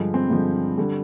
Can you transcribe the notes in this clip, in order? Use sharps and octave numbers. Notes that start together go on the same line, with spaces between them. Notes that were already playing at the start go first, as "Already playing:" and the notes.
Already playing: G2 D3 F3 G#3
C4
G2 D3 F3 G#3
D3 G3